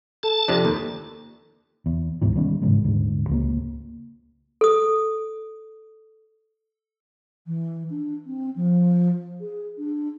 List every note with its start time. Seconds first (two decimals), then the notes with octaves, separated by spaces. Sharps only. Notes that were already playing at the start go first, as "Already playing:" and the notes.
0.23 A4 A5
0.48 F2 C3 D4
0.65 D#2
1.86 E2
2.22 D2 G#2 B2 E3
2.35 D#3 G3 B3 C#4
2.62 G#2 C#3 E3 G#3
2.84 D#1 G#2 D3
3.29 C#2 A3 A#3
4.61 A4 D#6
7.47 E3
7.90 D4
8.26 C4
8.56 F3
9.41 G#4
9.78 D4